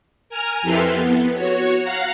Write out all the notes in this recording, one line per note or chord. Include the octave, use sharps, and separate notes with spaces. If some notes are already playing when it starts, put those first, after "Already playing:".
A#4 G#5 A#5 F6
F2 E4 G4 A4 B4 C6
B3
F#4 C#5
F5 F#5 A#5